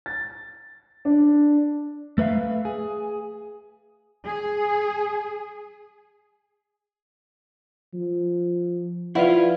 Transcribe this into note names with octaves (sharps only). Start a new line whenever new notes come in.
A6
D4
A3 B4 E5 F5
G#4
G#4
F3
F3 E4 F4 B4 D5 F#5